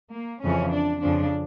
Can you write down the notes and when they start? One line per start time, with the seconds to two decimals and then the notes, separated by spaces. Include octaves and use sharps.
0.13 A#3
0.43 F2 C#3 E3 C#4
0.72 D4
1.01 F2 C#3 F3 D4